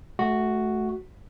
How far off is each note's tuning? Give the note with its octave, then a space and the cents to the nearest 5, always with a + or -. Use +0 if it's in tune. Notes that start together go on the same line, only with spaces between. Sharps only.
A3 -20 F#4 +0